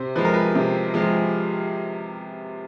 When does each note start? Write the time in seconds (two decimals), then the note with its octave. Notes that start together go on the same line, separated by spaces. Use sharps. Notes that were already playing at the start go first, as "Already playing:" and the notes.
Already playing: C3 C5
0.15 F3 G#3 B4
0.25 A#4
0.34 B4
0.55 C3
0.94 F3 G#3